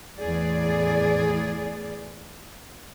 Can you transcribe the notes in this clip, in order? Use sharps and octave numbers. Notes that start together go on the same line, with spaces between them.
E2 A2 E3 G#4 D5